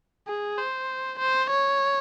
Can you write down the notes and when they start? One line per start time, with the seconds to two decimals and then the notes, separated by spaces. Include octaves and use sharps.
0.28 G#4
0.58 C5
1.19 C5
1.50 C#5